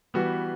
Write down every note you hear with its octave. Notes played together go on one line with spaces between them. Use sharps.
E3 G3 B3 F#4